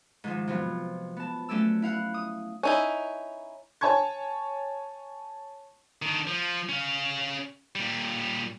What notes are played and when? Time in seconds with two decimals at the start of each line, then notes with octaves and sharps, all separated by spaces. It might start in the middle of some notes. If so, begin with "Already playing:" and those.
0.24 G#2 D#3 F3
0.47 C3 F3 F#3 B3
1.17 B3 A5
1.49 F#3 A3 C#4 D5 E6
1.82 E4 F5 F#5
2.14 D#6
2.63 C#4 D#4 E4
3.81 C#5 G#5 A5 C#6 G#6
6.02 D#3 D4
6.27 F3
6.69 C#4 F5
7.75 A#2 G3